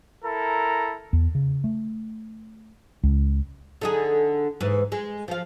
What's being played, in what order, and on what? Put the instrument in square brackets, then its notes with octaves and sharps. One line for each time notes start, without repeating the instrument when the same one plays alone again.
[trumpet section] E4 A4 A#4 A#5
[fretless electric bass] E2
C#3
A3
C#2
[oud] D3 D#4 G#4
G#2 E3
G#3
F3 F5